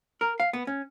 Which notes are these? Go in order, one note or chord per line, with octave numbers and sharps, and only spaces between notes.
A#4
F5
B3
C#4